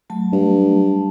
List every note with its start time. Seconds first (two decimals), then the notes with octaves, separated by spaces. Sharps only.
0.10 F#3 A3 A5
0.32 G2